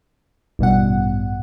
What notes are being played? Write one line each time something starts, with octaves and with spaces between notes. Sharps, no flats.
A1 G2 B2 F#5